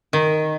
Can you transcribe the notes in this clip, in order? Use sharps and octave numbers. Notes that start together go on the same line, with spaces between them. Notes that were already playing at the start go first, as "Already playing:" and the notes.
D#3